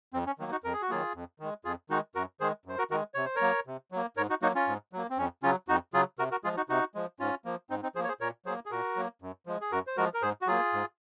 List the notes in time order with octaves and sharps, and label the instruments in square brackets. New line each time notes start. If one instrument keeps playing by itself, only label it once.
[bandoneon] F2 C4
C#4
D#3 F#3 A#3
D#4 F#4
F2 A#4
G#4
F#4
D#3 F#3 A#3 F4 G#4
F2
D#3 G#3
F2 F4 G#4
D#3 G#3 D#4 F#4
F#2 F#4 A#4
D#3 G#3 G#4 C5
F#2 C5
F#4 A#4
D#3 G#3 F#4 A#4
C3 C#5
C5
A#4 C#5
F#3 A#3
C3
F#3 A#3
G#2 A#4 C#5
D#4 F#4
F#3 A#3 D#4 F#4
C#4 F4
G#2
F#3 A#3
C4
F2 C#4
C#3 F#3 C#4 F4
F2 D#4 F#4
C#3 F#3 F4 G#4
C3 F#4 A#4
F#4 A#4
F3 G#3 F4 G#4
D#4 F#4
C3 D#4 F#4
F3 G#3
G#2 C#4 F4
F3 A#3
G#2 C4 D#4
C4 D#4
F3 G#4 C5
A#3 C#5
G#4 C5
A#2 A#4 C#5
F#3 G#4 C5
A#3
G#4
A#2 F#4 A#4
F#3 A#3
F#2
F3 G#3
G#4
F#2 F#4 A#4
C5
F3 G#3 F#4 A#4
A#4
G#2 G#4 C5
F#4
F#3 A#3 F4 G#4
G#2